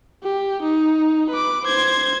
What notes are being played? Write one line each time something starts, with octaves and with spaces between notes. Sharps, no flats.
G4
D#4
B4 D6
C5 G#6